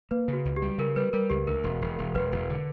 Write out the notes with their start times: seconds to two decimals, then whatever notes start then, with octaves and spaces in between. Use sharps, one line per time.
0.11 A#3 B4
0.28 C#3 F#4
0.45 C#2
0.56 G4
0.62 G3
0.78 C#3 A#4
0.96 G3 B4
1.13 G3 A#4
1.30 C#2 G4
1.47 D2 A#4
1.64 E1
1.81 E1
1.98 E1
2.14 E1 B4
2.32 E1
2.50 D3